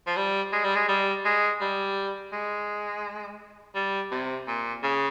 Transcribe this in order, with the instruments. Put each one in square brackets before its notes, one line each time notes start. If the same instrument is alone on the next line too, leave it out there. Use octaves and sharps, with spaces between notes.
[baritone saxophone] F3
G3
G#3
G3
G#3
G3
G#3
G3
G#3
G3
C3
A#2
C#3